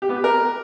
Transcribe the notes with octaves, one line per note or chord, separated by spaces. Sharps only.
G4
B3
G4
A#4